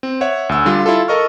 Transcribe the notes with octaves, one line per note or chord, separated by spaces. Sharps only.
C4
C#5 E5 F#5
D2 E6
D3 G3 F4
E4 F4 A4
A4 A#4 D#5 C#6 F6